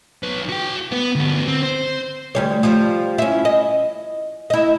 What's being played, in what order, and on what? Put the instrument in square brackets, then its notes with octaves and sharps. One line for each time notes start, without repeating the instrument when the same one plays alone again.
[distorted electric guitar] B1 B4
F#4 G5
B3
D2 B3
C4
C5
[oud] D2 G3 C#5
F3 G3
C#4 E4
D#5
E4 D#5